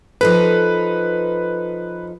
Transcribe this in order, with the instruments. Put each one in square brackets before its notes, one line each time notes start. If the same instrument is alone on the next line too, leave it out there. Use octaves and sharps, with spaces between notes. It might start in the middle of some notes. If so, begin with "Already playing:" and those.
[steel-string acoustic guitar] F3 D#4 A4 [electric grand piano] B4